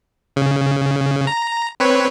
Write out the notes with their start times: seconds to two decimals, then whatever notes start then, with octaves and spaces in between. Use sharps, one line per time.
0.36 C#3
1.27 A#5
1.80 C4 B4 C#5